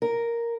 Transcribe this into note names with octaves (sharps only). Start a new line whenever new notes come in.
A#4